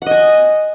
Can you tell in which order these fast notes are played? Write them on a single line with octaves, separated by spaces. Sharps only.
F#5 D#5 G#5